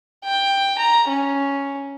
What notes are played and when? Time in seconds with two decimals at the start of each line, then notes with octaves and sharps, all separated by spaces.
0.24 G5
0.79 A#5
1.08 C#4